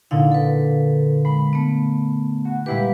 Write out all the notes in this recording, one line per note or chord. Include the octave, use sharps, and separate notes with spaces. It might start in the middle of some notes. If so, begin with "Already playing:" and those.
A#2 D3 D#4 E4 F5
A4 B4
G#3 B5
A3 B3
F#4
A#2 G3 G#3 E4 G4 B4